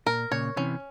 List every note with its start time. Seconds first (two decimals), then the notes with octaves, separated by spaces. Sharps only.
0.06 A#2 A#4
0.31 A#2 C#3 C#5
0.56 C3 E3 C#4